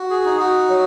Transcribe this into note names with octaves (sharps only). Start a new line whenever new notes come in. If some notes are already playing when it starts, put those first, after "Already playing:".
Already playing: F#4
G#4
D#4
F#4
F#3